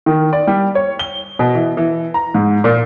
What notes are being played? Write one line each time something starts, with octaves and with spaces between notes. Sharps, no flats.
D#3
D5
G3
C#5
G7
B2
E3
E3
A#5
G#2
A#2